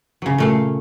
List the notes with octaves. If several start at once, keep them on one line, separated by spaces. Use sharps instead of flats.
C#3 F#3
A#2 A3 F5